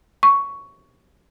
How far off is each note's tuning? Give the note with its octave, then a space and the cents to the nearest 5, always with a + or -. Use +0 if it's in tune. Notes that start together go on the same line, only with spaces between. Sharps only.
C#6 +10